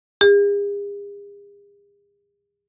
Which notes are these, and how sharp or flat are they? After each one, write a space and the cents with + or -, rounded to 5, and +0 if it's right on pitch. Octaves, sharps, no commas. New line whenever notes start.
G#4 -45